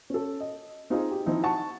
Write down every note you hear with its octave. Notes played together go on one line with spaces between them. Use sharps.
C#4 A4
D#5
C4 D#4 F4 G#4
G4
F3 C4 D#4 E4
F#5 A5 C#6